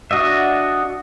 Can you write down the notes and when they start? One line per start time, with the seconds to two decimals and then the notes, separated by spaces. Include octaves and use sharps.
0.11 D4 F#4 D#5 E5